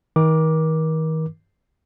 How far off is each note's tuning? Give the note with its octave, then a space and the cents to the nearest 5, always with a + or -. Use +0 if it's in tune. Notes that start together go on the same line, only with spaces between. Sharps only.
D#3 +35 A#4 +35 D6 +0